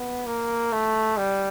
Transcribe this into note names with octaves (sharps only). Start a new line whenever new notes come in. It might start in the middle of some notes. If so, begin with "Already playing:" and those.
Already playing: B3
A#3
A3
G3